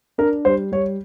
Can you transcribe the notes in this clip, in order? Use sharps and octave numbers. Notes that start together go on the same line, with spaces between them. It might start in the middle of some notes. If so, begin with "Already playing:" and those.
D4 A#4
G3 C5
G3 C#5